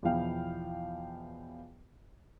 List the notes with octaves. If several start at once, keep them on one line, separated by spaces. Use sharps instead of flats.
E2 B2 F3 E4 F5 G5